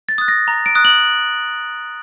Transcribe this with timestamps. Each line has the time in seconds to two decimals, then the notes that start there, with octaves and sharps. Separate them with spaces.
0.09 A6
0.18 D#6 F#6
0.28 A#6
0.48 A#5
0.66 D7
0.75 D#6 F#6
0.85 F#7